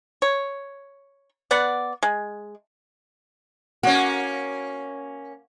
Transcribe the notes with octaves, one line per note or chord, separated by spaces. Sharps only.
C#5
B3 D5 F#5
G#3
A#3 C#4 F#4